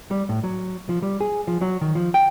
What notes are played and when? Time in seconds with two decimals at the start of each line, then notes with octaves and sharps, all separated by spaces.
0.11 G3
0.29 A2
0.44 F#3
0.89 F3
1.02 G3
1.21 G#4
1.47 F3
1.61 F#3
1.81 D#3
1.95 F3
2.14 G5